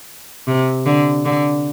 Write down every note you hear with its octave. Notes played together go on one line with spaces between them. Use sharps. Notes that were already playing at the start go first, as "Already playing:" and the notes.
C3
D3
D3